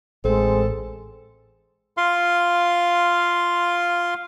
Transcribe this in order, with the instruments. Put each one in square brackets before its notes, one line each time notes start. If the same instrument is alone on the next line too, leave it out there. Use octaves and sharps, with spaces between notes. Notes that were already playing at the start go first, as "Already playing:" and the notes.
[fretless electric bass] A1 [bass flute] G#3 [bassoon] C4 [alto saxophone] A4
[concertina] F4 F5 C6